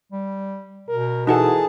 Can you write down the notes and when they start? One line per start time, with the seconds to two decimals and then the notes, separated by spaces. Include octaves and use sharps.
0.12 G3
0.89 B2 A#4
1.27 E3 D#4 F#4 G#4 A4 A5